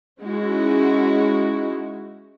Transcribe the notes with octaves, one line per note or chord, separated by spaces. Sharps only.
G#3 C#4 D#4 E4 F#4